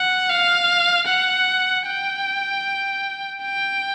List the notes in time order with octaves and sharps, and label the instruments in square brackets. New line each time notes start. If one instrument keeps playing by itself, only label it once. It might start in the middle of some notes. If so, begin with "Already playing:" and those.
Already playing: [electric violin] F#5
F5
F#5
G5
G5